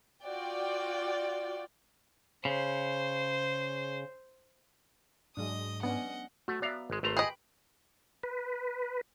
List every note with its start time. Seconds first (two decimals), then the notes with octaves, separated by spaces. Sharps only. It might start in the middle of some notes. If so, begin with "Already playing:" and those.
0.24 F4 F#4 D5 G5
2.45 C#3 C5
5.37 G#2 F#3 G#3 D4 D#5 D#6
5.83 B3 C#4 D4 D#5 F#5
6.48 A3 F#4
6.62 B3 D5 E5 F5 A#5
6.90 G#1 G#3
7.03 G#1 A3 B4 A#5 C6
7.17 G#4 D#5 G5 B5
8.23 B4